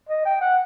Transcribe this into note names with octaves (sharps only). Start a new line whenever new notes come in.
D#5
G5
F#5